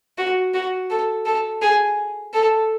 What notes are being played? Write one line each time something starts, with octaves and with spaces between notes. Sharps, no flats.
F#4
F#4
A4
A4
G#4
A4